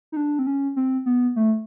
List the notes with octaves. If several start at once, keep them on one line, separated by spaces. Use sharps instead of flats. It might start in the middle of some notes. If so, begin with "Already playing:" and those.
D#4
D4
C4
C#4
C4
B3
A3